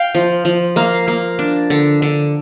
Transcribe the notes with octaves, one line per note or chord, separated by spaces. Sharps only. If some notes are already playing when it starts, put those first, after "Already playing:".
Already playing: F5 G5
F3
F3
A#3 F5
A#3
D4
D3
D3